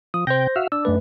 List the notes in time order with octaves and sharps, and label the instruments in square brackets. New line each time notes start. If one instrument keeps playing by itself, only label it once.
[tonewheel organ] F3 [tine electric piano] D#6
[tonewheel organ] C3 G5 [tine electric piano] C5 G6 A#6
[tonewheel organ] F#4 E5 F5
[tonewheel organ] D4 [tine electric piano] E6
[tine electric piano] F#2 A3 B4